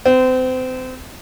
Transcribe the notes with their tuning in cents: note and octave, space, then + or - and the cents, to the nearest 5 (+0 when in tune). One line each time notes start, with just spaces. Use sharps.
C4 -30